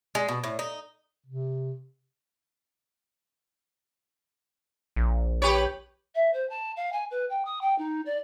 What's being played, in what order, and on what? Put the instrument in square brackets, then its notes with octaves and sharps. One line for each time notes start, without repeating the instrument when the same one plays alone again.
[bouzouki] G#3
B2
A2
D#4
[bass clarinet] C3
[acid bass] A#1
[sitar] G4 B4 C#5
[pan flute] E5
C5
A5
F5
G#5
B4
G5
D#6
G5
D#4
D5